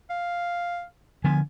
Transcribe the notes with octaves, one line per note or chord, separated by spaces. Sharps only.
F5
D3 F3 B3 G#5